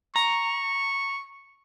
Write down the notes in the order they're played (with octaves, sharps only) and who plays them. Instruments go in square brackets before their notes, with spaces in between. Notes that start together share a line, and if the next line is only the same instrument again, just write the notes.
[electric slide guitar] A#5 [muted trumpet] C#6